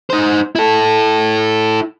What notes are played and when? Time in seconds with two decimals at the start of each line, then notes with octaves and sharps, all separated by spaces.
0.10 D#4 C5
0.56 E4 A4